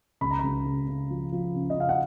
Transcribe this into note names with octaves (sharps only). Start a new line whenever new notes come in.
C#2 B5
A#5
C#2 B5
C#3
C#3
F3
F3
C#3
D#5
C#3 F5
F#5